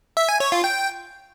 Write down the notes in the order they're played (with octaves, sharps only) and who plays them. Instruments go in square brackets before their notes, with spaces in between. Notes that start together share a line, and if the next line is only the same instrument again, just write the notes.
[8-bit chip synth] E5
G#5
C#5
F4
G5